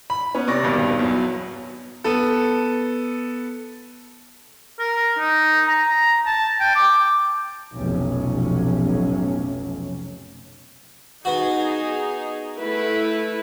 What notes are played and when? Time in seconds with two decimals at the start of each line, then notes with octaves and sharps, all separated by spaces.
0.10 B5
0.35 B3 C#4
0.48 C3 D5 C#6 A#6
0.63 D#1 G#1 G2 B2
0.99 E2 F#3
2.04 B3 A4
4.79 A#4
5.18 D#4
5.68 A#5
6.26 A5
6.60 G5
6.75 D6
7.73 F1 B1 A2 C3 C#4
11.25 B3 D#4 F#4 G#4
12.59 A3 E4 B4